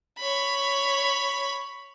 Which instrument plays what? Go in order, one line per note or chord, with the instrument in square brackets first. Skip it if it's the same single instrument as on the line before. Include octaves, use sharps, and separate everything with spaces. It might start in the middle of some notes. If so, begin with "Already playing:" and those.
[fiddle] C#5 B5